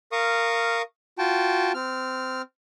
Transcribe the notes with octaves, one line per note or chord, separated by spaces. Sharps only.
A#4 F5 C#6 D#6
F4 F#4 G5 A5
C4 F6